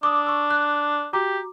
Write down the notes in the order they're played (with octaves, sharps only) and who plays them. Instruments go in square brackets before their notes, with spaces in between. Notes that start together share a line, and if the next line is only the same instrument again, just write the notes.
[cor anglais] D4 [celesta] D6 D#6
[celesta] C#6 E6
F#6
[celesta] F#4 A#5 D6 [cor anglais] G4